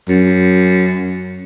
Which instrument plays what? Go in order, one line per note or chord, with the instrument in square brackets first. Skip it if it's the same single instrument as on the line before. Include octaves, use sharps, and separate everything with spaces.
[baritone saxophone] F#2